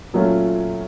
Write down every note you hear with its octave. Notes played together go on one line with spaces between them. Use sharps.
A#2 F#3 A3 C#4 F4